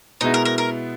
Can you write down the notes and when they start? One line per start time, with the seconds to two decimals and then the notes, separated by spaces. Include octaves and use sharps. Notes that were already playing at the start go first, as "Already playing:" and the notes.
0.21 B2 G#3 B3 D#4 E4
0.34 A#4
0.45 A#4
0.58 A#4